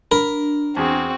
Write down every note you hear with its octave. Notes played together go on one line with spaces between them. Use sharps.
D4 A#4 B5
E2 C4 F#4 G#4